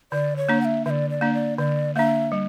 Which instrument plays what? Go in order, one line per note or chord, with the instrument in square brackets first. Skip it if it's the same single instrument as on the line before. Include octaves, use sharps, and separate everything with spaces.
[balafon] D3 [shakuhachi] D5
[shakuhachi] C#5
[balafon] A#3 D4
[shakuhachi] F#5
E5
[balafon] D3 [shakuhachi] D5 E5
[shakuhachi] D5
[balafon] A#3 D4
[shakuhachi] D5
[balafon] D3 [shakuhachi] D5
[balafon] A#3 D4 [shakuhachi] E5
[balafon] G3